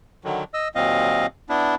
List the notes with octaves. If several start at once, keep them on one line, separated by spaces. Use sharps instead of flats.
D3 D#3 F#3
D#5 E6
D#2 A#2 F#3 C4 D#5 F5
B3 D4 E4